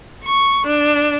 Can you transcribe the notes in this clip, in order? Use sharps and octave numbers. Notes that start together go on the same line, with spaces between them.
C#6
D4